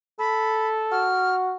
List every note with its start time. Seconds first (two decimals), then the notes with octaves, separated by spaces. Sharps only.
0.19 A4 B5
0.92 F#4 F6